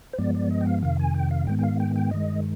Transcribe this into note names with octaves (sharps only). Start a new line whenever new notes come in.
C5
G2 F3 G#3 B3 D5
D5
D#5
G5
F5
F2 C3 D#3 F5
G#5
G5
F5
G#2 D#3 G#3 B3 G5
G5
F5
G5
G5
G2 D#3 G#3 D#5